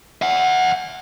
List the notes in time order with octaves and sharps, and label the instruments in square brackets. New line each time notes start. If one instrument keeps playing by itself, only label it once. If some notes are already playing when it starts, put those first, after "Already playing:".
[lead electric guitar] E5 F#5